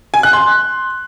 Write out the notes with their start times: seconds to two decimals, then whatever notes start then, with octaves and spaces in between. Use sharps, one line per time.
0.14 G#5
0.23 F#6
0.33 C6